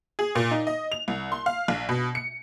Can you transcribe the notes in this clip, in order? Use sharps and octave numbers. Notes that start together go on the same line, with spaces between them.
G#4
A#2
D#4
D#5
F7
C2
C6
F5
A#1
B2
C#7